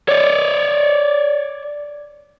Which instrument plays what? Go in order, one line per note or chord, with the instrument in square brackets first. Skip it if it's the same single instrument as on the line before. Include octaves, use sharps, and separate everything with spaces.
[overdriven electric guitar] C#5 D5